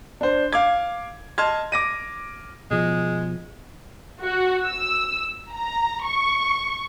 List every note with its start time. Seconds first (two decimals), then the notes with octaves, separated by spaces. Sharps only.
0.21 D4 C5
0.53 F5 D6 G#6
1.38 D#5 A5 C6 F6 G#6
1.72 D6 A#6 D#7
2.71 B2 F3 G#3
4.24 F#4
4.66 E6
5.53 A#5
6.06 C#6